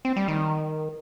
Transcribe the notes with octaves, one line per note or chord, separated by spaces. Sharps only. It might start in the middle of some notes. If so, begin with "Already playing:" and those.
C4
G3
D#3